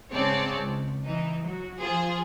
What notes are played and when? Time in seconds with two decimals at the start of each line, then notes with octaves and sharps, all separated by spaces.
0.11 G#2 C#3 C4 C#5 D5 A5
0.57 C#2
1.05 E3 D#4
1.43 F#3 F#4
1.80 F3 F4 G#4 C5